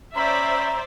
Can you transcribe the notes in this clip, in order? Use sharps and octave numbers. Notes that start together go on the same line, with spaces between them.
C#4 C5 D5 E5 A#5 B5